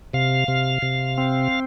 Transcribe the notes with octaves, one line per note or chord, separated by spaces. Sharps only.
C3 F5
C3
C3
C4